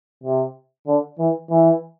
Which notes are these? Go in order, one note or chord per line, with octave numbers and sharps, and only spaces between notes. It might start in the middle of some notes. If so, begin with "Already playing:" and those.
C3
D3
E3
E3